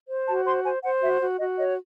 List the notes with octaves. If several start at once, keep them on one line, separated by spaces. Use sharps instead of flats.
C5
F#4 A5
C5 C6
C5 G#5
C5 F#5
F#4 E5
F#4
F#4 D#5
C#5 D#5